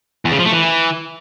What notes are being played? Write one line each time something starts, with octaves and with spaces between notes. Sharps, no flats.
E2
C#3
F3
A3
E3